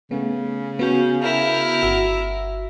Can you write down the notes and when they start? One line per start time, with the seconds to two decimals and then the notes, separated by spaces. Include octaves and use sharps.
0.11 C#3 A3 B3
0.79 B3 C#4 F#4 G6
1.22 E4 A#4
1.83 G1 F#4 E6